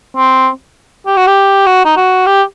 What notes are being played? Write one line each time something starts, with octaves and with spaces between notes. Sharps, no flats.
C4
G4
F#4
G4
F#4
D#4
F#4
G4